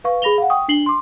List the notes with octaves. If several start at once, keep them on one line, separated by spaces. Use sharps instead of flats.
B4 F5 C#6
G#4 B5 A#6 F7 G7
F5 F#5
G5 C#6 D#6
D4 C7 F#7 G7
C6 D6